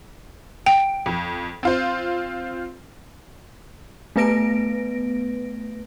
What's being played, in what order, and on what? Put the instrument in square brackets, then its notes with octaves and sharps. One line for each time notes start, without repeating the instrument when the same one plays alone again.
[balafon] G5 [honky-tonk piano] D7
[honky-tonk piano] F2
C4 F4 C5
[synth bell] A3 B3 B4 A#6 D7